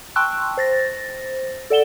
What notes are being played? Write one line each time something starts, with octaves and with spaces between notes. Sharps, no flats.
G5 A5 C6 C#6 E6 F#6
C5 A6 A#6
A4 D5 F#5 E7 G7